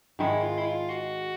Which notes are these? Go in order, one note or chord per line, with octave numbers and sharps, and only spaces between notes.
G#2 D#3 G#3 E4
F4
E4
F4
F#4